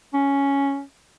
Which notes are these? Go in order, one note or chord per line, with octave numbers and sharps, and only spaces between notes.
C#4